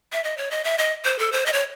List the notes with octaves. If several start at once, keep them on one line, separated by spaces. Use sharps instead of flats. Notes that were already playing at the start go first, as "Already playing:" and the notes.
E5
D#5
C#5
D#5
E5
D#5
C5
A4
C5
D#5
C#5